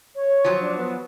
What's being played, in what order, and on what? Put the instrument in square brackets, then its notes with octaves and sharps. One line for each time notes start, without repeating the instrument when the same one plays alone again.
[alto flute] C#5
[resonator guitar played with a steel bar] F3 F#3
[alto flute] D4
B3